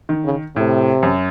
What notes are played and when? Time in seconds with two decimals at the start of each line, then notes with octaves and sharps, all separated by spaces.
0.09 D#3
0.24 C#3
0.56 A2 C3
1.03 F#2